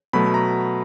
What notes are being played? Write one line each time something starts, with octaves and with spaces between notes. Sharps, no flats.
B2 F#3 A3 B5
A#5